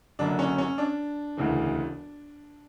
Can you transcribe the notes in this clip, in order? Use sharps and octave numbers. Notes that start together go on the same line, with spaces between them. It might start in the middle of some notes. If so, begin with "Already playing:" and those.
F#1 F#2 D3 D4
C#4
C#4
D4
E1 D2 C#3 E3